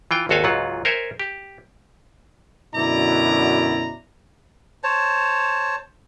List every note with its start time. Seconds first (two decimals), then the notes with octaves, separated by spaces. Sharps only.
0.11 E3 F4 G5
0.29 G#1 D#2 F#4 A4 F5 G#5
0.44 C#2 G#2 F#3 F4 F#5
0.85 A#4 C5 C#5 E5 G#5
1.20 G4
2.75 F#2 B2 D3 E4 D5 A#5
4.84 C5 C#5 A5